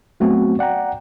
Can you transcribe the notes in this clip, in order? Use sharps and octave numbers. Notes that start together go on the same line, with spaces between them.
F#3 A3 B3 C4 F#4
D5 F#5 G5 A#5